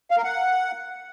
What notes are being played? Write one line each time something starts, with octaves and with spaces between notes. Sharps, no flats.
F5
A#4
F#5